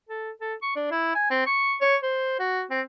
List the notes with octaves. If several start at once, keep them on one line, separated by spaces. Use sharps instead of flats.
A4
A4
C#6
D4
E4
G#5
C4
C#6
C#5
C5
F#4
C4